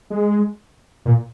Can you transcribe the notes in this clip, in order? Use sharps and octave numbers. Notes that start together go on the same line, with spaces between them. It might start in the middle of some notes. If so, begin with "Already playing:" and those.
G#3
A#2